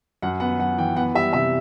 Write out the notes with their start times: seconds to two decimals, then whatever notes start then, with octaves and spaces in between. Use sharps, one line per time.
0.22 F#2 F#5
0.40 B3 F#5
0.59 F#2 F#5
0.78 E3 G5
0.96 B3 F#5
1.15 G3 E5
1.33 C3 E5